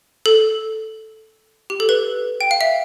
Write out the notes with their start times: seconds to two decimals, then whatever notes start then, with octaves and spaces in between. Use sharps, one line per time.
0.26 A4
1.70 G4
1.80 A4
1.89 B4
2.41 G5
2.51 F5
2.61 E5